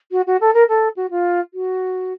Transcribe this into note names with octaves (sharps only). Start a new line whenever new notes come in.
F#4
F#4
A4
A#4
A4
F#4
F4
F#4